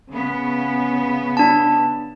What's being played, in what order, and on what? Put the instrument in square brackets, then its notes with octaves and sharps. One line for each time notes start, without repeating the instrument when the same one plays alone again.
[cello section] C#3 B3
[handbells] D4 A5